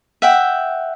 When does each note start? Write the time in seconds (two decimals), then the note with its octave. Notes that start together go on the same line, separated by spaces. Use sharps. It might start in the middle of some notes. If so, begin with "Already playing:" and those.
0.22 E5 F#5 G5